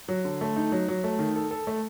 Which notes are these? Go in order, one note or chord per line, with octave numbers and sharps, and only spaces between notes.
F#3
D3
A3
D#4
F#3
F#3
A3
D#3
A4
A4
A3